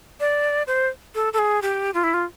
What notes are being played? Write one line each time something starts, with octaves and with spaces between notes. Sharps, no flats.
D5
C5
A4
A4
G#4
G4
F4
E4
F4